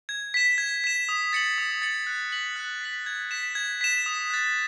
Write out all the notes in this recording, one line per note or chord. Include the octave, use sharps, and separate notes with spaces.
G#6
B6 E7
G#6
B6 E7
D#6
A6 C#7 F#7
D#6
A6 C#7 F#7
F#6
B6 F#7
F#6
B6 F#7
G#6
B6 E7
G#6
B6 E7
D#6
F#6 A6